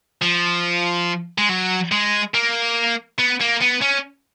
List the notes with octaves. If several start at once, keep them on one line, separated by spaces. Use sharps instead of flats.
F3
G#3
F#3
G#3
A#3
B3
A#3
B3
C#4